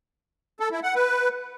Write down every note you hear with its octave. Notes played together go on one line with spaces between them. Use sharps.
A4
E4
F#5
B4